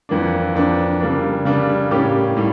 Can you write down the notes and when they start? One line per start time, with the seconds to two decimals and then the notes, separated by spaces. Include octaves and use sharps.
0.09 F2 E3 A#3 D4
0.55 F2 E3 A#3 D4
1.00 C#3 G3 A#3 D4
1.45 C#3 G3 A#3 D4
1.91 A2 G3 A#3 C#4 G4
2.37 A2 G3